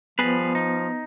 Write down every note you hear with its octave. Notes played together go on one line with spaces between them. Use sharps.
F3 G3 B3 G#4 B4
D#4